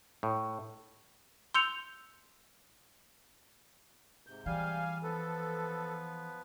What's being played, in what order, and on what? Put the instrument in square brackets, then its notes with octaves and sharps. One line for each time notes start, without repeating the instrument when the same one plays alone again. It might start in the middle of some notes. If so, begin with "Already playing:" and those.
[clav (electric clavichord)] A2
[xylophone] C6 E6 G6 C#7 F7
[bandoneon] G#2 C3 G6
[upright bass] E3 [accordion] G3 F5 G#5
[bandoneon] F3 B3 B4 [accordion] A4